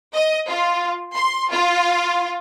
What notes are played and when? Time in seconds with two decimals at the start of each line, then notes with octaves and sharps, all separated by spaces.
0.14 D#5
0.48 F4
1.14 C6
1.52 F4